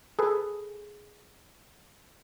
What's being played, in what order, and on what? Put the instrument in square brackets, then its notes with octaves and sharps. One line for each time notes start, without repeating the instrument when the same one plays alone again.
[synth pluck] G#4 A4 B4